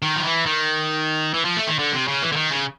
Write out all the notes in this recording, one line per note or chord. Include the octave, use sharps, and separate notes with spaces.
D#3
F3
E3
D#3
E3
F3
A3
D#3
D3
C3
C#3
E3
D3
D#3
C#3